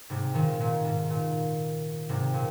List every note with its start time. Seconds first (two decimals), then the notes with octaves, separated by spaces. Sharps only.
0.10 G#2 C3
0.34 A#2 D#3
0.60 A#2
0.85 G#2
1.10 A#2
2.09 G#2 C3
2.34 A#2